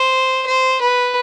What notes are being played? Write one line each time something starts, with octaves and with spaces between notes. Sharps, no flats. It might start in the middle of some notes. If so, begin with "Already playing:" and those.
Already playing: C5
C5
B4